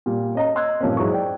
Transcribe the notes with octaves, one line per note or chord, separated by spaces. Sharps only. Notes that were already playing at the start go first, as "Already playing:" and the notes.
A#2 G3
C#4 D#5 A#5
D#5 C6 E6 F#6 G#6
G2 A#2 F3 A#3 C4 C#4
G#2 F#3 E4 G#4 C#6
C5 D5 G5